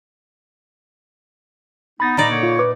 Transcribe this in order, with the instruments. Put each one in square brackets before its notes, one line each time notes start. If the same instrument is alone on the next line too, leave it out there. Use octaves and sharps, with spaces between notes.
[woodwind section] B3 D#4 [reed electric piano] B5 A6
[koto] A#2 D#4 D5 [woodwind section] A#5
[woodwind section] D3 A#3 C#5
[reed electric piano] F4
B4 D6